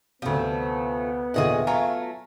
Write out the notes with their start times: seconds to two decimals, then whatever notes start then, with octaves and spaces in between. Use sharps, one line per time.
0.22 D2 C3 F3 A3 B3
1.34 D#2 A#2 D3 G#4 D#5 E5 F#5
1.67 F#3 A3 F4 G#5 A#5